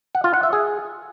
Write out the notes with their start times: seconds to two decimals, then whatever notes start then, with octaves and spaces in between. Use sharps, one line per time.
0.15 F#5
0.24 F4
0.34 F#5
0.43 E5
0.53 G#4